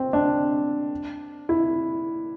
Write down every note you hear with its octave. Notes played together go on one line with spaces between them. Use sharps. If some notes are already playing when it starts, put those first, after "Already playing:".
Already playing: C4
D4
E4